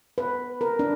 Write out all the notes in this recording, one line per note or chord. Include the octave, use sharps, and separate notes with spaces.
B4
A#4
D4